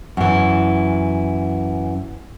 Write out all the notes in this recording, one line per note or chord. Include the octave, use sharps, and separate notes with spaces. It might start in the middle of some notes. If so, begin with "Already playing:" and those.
F#2 E3